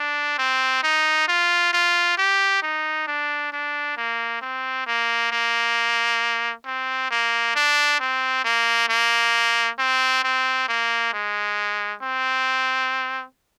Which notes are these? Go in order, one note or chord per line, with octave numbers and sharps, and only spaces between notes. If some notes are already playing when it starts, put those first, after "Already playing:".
Already playing: D4
C4
D#4
F4
F4
G4
D#4
D4
D4
A#3
C4
A#3
A#3
C4
A#3
D4
C4
A#3
A#3
C4
C4
A#3
G#3
C4